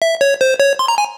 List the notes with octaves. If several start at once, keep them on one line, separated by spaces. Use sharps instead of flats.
E5
C#5
C5
C#5
C6
A#5
G#5